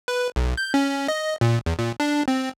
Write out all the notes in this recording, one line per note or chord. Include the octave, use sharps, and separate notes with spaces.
B4
B1
G6
C#4
D#5
A#2
E2
A#2
D4
C4